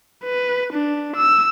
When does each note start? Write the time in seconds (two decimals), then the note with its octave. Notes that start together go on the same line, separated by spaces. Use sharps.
0.24 B4
0.73 D4
1.16 E6